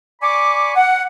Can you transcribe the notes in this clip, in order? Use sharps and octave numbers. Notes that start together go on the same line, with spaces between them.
D5 G#5 B5 C#6 D6
F#5